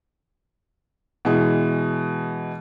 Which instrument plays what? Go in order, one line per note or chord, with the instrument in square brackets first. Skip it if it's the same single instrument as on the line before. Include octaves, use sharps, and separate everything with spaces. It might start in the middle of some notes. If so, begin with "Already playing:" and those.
[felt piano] B2 E3 G#3